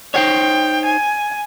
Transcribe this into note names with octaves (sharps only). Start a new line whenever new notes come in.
D#4 C5 C#5 G5
G#5